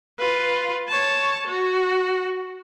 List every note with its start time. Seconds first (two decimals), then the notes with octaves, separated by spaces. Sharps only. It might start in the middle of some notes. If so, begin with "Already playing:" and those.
0.19 F4 B4
0.88 C#5 A5
1.47 F#4